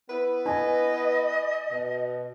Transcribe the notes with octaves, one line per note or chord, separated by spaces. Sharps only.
B3 E4 B4
D#5 G#5
B2